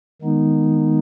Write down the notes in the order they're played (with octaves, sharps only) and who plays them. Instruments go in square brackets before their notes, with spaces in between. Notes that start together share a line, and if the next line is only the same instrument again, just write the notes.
[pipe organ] D#3 G#3 B3 D#4